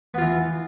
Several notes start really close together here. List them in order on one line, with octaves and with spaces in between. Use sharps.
B3 F4 E3